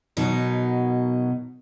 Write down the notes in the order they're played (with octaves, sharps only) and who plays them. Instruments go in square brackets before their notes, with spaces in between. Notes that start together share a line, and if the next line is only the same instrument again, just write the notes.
[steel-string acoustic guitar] B2 F#3 D#4 A#4